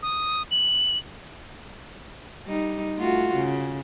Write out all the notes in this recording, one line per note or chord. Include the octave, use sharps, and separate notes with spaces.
D#6
F#7
G3 D#4
A3 F4 F#4
C#3